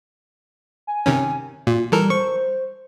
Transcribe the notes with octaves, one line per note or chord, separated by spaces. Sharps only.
G#5
C3 D#3 C#4
A#2 F4
E3 G3 A4 A#4
C5 C#6